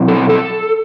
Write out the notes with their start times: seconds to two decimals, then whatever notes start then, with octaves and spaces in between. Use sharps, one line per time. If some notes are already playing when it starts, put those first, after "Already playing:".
Already playing: B2 F#3 C4 E4
0.08 A4
0.29 A4